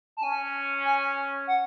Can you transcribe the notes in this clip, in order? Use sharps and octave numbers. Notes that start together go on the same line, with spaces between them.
A5
C#4 G#5
G#5
F#5